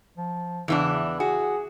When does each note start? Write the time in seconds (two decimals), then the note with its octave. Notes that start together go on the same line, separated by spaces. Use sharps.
0.18 F3
0.68 E2 C#3 E3 D4
1.20 F#4 G#4